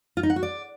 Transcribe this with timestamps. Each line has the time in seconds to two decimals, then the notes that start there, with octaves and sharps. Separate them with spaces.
0.17 F4
0.23 D#4
0.30 F#5
0.36 F#4
0.43 D5